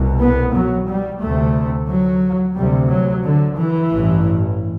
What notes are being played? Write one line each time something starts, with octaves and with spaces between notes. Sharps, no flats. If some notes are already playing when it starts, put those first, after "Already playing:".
Already playing: C2 B2
B3
F#3
G3
D2 C3 A3
F#3
D2 C3 G3
F#3
D3
E3
A1 G2